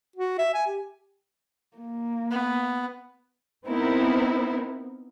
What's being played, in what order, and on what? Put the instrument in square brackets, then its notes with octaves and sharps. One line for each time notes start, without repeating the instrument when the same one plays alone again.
[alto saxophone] F#4
E5
G#5
G4
[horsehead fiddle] A#3
[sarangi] B3
[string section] B3 C4 D#4 E4 A#4